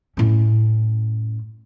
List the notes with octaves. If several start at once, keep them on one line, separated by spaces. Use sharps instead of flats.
A2 C#4